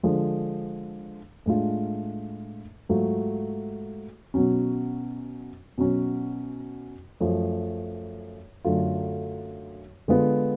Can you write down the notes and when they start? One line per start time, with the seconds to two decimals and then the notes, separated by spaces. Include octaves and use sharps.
0.03 D3 F3 G#3
1.46 A2 G#3 D4 F4
2.89 G#2 F#3 A3 F4
4.34 B2 F#3 C#4
5.78 B2 F#3 C#4
7.20 F#2 F3 A3
8.65 F#2 D3 F#3 A3 F4
10.08 D3 G#3 B3 F4